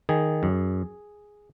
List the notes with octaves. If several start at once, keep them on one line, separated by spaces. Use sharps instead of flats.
D#3 G#4
F#2